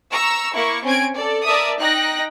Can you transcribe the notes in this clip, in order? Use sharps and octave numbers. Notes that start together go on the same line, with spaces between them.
A#5 C#6 E6
A#3 E4 C#6
C4 C#4 G#5 G#6 D7
A4 D5
A#4 D5 E5 A5 D#6
D#4 G5 F#6 A#6